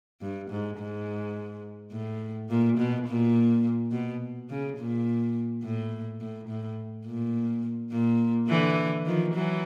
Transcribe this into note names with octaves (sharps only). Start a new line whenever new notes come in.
G2
G#2
G#2
A2
A#2
B2
A#2
B2
C#3
A#2
A2
A2
A2
A#2
A#2
D3 E3
D#3 F3
E3 F#3